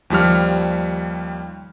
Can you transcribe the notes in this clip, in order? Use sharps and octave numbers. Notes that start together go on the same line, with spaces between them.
D#2 F3 G3 F6